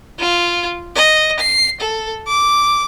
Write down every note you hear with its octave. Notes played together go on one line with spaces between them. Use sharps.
F4
D#5
C7
A4
D6